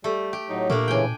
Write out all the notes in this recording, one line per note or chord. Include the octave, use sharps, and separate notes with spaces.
G3 A3
G4
A2 F#3 D#4
A#2 A3 A#3 D4
A2 C#3 E3 G5 G#5